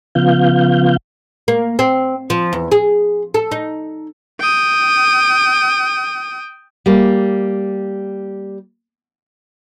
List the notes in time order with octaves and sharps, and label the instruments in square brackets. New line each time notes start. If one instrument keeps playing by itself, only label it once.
[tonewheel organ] C#3 F3 B3 F4 F5 G6
[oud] A#3
C4
F3
E2
G#4
A4
D#4
[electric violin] G5 D#6
[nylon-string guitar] G3 A#3